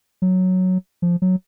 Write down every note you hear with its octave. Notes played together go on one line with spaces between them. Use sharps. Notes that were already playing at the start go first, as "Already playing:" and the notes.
F#3
F3
F#3